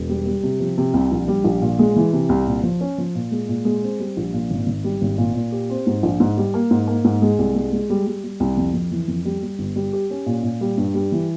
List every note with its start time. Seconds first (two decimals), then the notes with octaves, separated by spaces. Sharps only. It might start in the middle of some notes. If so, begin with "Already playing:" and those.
Already playing: E1
0.09 G3
0.26 G3
0.43 C3
0.60 F3
0.78 C3
0.94 C2
1.12 A#1
1.28 G3
1.45 A#1
1.61 A#2
1.79 G#3
1.96 E3
2.13 C3
2.29 C2
2.47 A#2
2.63 F3
2.81 C#4
2.98 F3
3.15 A#2
3.32 G#3
3.49 A#2
3.65 G#3
3.82 C4
4.00 G3
4.17 A#1
4.33 A#2
4.51 G#1
4.67 G#1
4.84 G3
5.02 G#1
5.18 A#2
5.35 A#2
5.52 G4
5.70 C4
5.87 G#2
6.03 A#1
6.20 G#2
6.37 G3
6.54 A#3
6.71 G#2
6.87 A#3
7.04 G#2
7.22 G#3
7.39 C2
7.55 G#3
7.72 G#3
7.90 G3
8.07 G3
8.24 G3
8.40 C2
8.57 F2
8.74 F2
8.91 E3
9.08 F2
9.25 G3
9.43 G3
9.59 G1
9.76 G3
9.93 G4
10.10 C#4
10.26 A#2
10.43 A#2
10.61 G3
10.77 G2
10.94 G3
11.12 E3